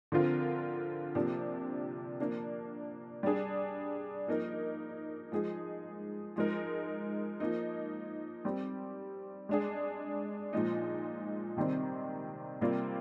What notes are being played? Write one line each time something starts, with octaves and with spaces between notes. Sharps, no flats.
D3 F3 C4 F4 A#4
C3 F3 A#3 D4 G4
F3 A#3 D4
G3 D4 G#4
F3 A#3 D#4 A#4
F3 G#3 D#4 G#4
F3 G#3 D#4 A#4
F3 A#3 D#4
G3 C4 G4
G#3 D4 G#4
A#2 F3 G#3 D#4
C3 D#3 G3 C4
C3 G3 A#3 F4